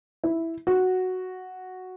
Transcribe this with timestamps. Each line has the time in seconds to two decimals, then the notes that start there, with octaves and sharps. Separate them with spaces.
0.24 E4
0.67 F#4